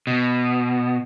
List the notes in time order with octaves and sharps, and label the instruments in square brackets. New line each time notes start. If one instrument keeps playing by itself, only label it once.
[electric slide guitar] B2